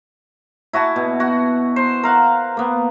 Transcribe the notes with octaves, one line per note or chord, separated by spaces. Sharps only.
E4 F#4 G#5 A5
B2
F#4
C5
A#4 F5 F#5
A#3 B3